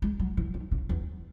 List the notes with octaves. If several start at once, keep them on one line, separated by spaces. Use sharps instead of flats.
G#3
F#3
E3
D#3
C#3
E2